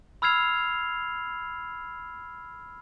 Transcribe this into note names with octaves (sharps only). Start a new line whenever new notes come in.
B5 E6 F6 G#6 C7 F7